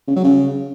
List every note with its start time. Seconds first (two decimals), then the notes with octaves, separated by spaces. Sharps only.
0.08 C#3
0.16 F#3
0.24 C#3